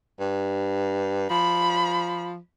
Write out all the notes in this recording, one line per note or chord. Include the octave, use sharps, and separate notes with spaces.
G2
F3 B5